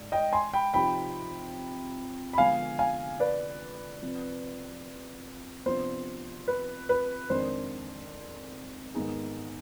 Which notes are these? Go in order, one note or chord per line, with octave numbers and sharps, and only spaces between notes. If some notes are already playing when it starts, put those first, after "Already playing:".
Already playing: G#2 D4
D#5 G5
G#5 C6
G5 B5
C3 F3 C4 D#4 G4 G5 B5
B5
D3 F3 G#3 B3 F5 G#5
F5 G#5
B4 D5
C3 F3 C4
C3 F3 B3 D4 C5
B4
B4
F2 D#3 G#3 D4 C5
G#2 D#3 B3 D#4 G#4